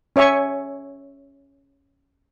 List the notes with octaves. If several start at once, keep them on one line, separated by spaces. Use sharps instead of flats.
C#4 C#5 E5 G#5 C#6